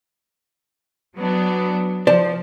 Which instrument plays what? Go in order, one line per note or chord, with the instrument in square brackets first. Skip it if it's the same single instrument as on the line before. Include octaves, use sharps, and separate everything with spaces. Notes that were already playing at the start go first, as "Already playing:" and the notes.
[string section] F#3 B3 D4
[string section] F3 [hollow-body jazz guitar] C5 D5 A5